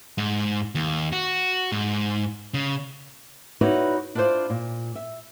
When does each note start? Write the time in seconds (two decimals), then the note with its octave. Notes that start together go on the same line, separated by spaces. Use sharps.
0.18 G#2
0.75 D#2
1.12 F#4
1.72 G#2
2.54 C#3
3.61 D#4 E4 F#4 B4 C#5 D5
4.15 D4 E4 F4 B4 C5 D5
4.50 A#2
4.95 E5